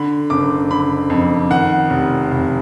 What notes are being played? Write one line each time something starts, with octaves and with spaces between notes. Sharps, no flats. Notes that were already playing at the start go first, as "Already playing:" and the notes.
Already playing: D3 B5
F#1 D6
D3 B5
F2
D#3 F#5
F1
F1